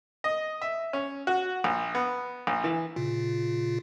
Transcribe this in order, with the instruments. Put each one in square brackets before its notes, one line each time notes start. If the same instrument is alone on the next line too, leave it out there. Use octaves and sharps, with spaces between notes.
[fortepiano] D#5
E5
C#4
F#4
A#1
B3
A#1
E3
[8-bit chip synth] A#2 C#3 F4